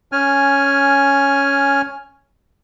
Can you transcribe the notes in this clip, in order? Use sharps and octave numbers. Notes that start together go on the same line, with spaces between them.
C#4 G#5 F6